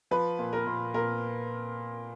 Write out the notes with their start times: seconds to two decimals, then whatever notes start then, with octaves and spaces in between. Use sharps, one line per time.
0.11 F3 B4
0.39 A#2
0.53 A#4
0.66 A#2
0.94 A#2 A#4